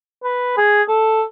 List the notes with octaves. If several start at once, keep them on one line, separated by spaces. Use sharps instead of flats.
B4
G#4
A4